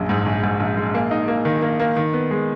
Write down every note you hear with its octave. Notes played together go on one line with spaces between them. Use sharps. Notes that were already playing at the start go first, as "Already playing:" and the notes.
Already playing: A#1 F#2
G#2
A#1
G#2
A#1
G#3
A#3
D#4
A#3
D#3
A#3
A#3
D#3
B3
G#3